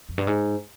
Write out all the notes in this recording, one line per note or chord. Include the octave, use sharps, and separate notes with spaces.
F2
G2
G#2